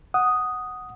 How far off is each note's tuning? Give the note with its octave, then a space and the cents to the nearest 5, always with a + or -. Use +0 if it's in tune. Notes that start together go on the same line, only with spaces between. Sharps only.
F#5 +0 D#6 +0